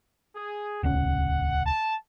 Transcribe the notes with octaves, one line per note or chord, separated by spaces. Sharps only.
G#4
D#1 C#2 C#4 F#5
A5